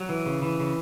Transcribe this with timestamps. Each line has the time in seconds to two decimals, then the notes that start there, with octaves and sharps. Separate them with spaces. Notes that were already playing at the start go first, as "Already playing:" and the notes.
Already playing: F#3
0.09 E3
0.25 C#3
0.42 E3
0.59 C#3